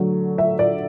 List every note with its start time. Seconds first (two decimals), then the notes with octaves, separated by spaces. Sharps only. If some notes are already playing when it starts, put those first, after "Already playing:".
Already playing: D3 F#3 A3
0.38 E5
0.59 D5